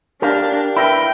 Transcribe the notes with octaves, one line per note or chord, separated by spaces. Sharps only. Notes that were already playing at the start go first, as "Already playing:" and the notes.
D4 G4 A#4 F5
E4 A#4 B4 G5